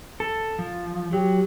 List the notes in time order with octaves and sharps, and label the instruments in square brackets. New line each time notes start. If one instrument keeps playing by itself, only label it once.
[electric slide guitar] A4
F3
[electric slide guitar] F#3 [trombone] G4